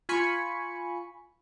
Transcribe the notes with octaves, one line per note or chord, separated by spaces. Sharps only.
F4 G#5 B5 C#6 C#7